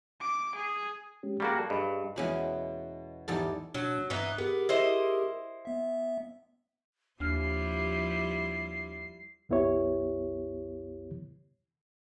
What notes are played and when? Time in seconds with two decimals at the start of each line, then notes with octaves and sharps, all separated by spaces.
0.21 D6
0.55 G#4
1.23 G#3 C#4 G4
1.40 G3 A#3 F#4 G#4 G5 C#6
1.58 A4 A5
1.70 G2 G#4 D#5 B5
2.16 E2 B2 G#3 C#4 E4 B5
3.28 E2 G#2 G3 G#3 A4
3.74 B2 F#3 D4
4.10 G2 E3 B3 D#4 F#6
4.38 B3 G4 G#4 A#4
4.69 E4 C5 D#5
5.65 B3 E5
7.20 D#2 F3 G3 D4 E4 F6 C7
9.49 C2 F#2 B3 E4 G4 C#5